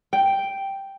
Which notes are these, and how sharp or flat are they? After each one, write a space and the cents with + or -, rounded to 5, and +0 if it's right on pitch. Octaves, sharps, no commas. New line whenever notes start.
G5 +0